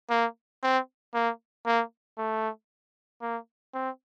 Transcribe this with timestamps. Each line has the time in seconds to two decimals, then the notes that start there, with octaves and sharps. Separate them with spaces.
0.10 A#3
0.63 C4
1.14 A#3
1.66 A#3
2.18 A3
3.22 A#3
3.74 C4